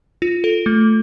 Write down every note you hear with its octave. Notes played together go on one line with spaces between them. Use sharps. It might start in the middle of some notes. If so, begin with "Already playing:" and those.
F4
A4
A3